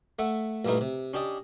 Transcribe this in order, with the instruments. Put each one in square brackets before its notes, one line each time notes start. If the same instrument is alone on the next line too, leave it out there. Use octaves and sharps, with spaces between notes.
[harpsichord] A3 E5 F#5
A#1 G2 E3 A3 D#4 A#4
C3
C#4 D4 G4 D5 D#5